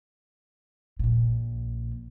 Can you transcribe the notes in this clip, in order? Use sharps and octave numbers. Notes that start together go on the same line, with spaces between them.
A#1 A#2